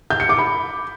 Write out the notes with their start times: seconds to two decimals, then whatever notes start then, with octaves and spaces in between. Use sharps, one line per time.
0.10 G6
0.20 C#7
0.29 D6
0.39 B5